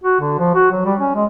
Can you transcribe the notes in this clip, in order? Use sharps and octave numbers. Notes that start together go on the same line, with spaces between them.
F#4
D3
F3
F#4
F#3
G3
C#4
G#3